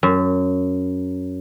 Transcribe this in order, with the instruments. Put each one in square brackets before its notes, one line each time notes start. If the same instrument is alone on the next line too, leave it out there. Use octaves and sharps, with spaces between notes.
[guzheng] F#2